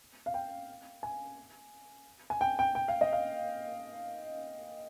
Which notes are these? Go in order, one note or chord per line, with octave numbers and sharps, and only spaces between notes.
F5
G5
G#5
G#5
G5
G5
G5
F5
D#5
F5